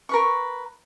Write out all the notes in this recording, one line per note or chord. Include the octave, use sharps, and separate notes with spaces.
A#4 B4 C#6